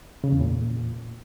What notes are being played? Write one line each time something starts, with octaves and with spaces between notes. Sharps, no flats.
C#3
E2
A#2